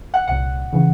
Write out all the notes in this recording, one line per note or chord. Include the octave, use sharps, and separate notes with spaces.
F#5
C2 A#2 F#5
C#3 E3